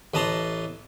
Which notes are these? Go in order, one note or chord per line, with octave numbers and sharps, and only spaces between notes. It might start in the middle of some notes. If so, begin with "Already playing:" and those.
A1 B4 D#5 A5 A#5 C6